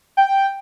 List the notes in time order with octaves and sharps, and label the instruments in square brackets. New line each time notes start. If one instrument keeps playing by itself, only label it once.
[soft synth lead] G5